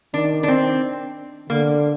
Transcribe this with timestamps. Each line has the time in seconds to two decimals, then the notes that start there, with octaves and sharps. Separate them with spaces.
0.14 D#3 D4
0.43 D4
0.48 C4
1.49 D3 A#3